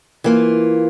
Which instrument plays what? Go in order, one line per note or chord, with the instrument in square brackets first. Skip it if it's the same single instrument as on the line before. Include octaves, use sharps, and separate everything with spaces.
[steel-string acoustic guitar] E3 A#3 F4